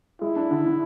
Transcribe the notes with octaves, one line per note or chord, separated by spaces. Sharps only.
G#3 E4
D4
D3
D3